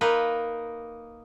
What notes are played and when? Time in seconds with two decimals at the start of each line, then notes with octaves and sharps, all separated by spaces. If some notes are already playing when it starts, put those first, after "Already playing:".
0.01 A#3 D#4 A#4 B4